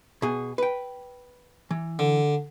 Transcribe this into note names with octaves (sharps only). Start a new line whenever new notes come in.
B2 G#4
B4 G5
E3
D3